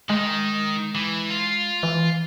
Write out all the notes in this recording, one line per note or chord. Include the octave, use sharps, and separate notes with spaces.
D#3 G#3 D#4
E3
F4
E3